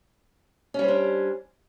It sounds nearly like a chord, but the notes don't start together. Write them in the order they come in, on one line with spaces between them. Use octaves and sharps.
C#4 G3 C5 D4